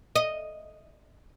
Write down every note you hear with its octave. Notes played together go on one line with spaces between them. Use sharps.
D#5